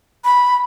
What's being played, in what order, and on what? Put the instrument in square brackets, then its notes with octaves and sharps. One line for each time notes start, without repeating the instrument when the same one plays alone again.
[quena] B5